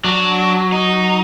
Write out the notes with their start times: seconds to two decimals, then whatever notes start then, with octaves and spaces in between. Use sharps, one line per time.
0.04 F#3 D4
0.72 D#4